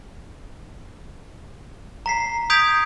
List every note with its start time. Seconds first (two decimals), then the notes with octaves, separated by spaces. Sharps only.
2.06 A#5 B6 C7
2.50 D#6 G6 G#6 B6 D7 F7